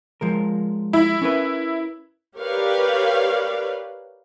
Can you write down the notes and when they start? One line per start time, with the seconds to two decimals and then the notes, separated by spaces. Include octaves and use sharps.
0.21 F3 G#3 A#4
0.93 E4
1.22 C#4 A#4 B4
2.38 G4 A#4 B4 C#5 D5 F5